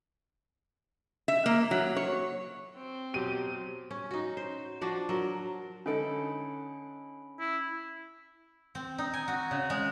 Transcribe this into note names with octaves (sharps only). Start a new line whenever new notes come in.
E5
A#3
F#3
C#5
C4
B2 F#3 G4 D#7
C#4
D#4 F#4
C5
F3 D4 F#4
F#3 A#4
D3 C#4 D#4 A4 B5 D7
E4
C4
D#4
G#5
F#4
C#3
G#3